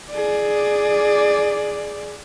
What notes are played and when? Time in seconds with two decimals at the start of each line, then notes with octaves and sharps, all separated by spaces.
0.11 G#4 D5